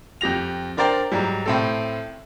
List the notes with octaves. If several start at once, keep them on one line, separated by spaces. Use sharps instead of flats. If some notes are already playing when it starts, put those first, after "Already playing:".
F2 G4 A#6 F7
D4 A#4 C5 D5 G5
G#2 F#3 G3
A2 C4 A4